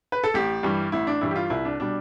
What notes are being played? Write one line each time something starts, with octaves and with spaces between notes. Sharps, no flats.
B4
A4
A1 G4
G2 E3 G3
A1 E4
D4
G2 E3 G3 E4
G4
F4
C2 E4
D4
B2 G3 D4